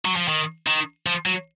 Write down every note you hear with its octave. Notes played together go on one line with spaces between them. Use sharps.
F#3
F3
D#3
D#3
F3
F#3